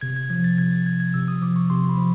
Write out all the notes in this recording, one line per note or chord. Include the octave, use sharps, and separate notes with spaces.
C3 G#6
G#6
F3 G#6
A6
C3 G#6
A6
F3 G#6
G#6
C3 E6
D#6
F3 D6
C#6
C3 C6
B5
F3